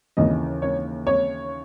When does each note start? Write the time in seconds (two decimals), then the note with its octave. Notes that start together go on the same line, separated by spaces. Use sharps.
0.17 D#2 C#3 E3 D#5
0.62 C#5
1.07 C#5